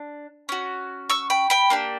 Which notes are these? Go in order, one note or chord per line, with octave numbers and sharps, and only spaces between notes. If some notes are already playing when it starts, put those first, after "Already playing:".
Already playing: D4
C#4 F#4
C#6 E6
G5 B5
G5 B5
A#3 D4 G4